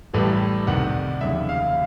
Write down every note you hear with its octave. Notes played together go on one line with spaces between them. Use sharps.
A1 A2 E3 G3
C2 C3 D#3 F#5
F1 D#2 C#3 E5
F5